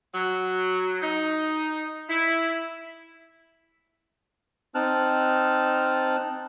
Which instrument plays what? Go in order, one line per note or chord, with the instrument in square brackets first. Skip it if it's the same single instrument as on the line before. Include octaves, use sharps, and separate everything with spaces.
[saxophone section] F#3
D#4
E4
[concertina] C4 D#4 A5 F6 F#6